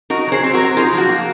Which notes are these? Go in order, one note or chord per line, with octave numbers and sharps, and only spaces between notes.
D#4 F#4 A#4
F#3 G#4 C5
C4
F#4 A#4
F#3
D#4 F4 G#4
F3
F#4
A#3